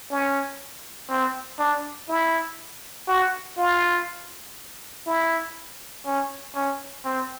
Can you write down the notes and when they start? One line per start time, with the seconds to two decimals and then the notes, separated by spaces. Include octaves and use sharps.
0.11 C#4
1.10 C4
1.59 D4
2.09 E4
3.08 F#4
3.58 F4
5.07 E4
6.06 C#4
6.55 C#4
7.05 C4